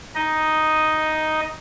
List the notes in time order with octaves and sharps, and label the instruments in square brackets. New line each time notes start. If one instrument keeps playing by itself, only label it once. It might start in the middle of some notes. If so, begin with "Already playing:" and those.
[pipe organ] D#4 D#5